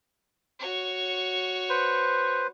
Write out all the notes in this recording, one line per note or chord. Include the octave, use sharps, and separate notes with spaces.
F#4 C#5
B4 C5